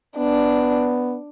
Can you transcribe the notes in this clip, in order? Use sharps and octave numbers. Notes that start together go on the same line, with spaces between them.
B3 D4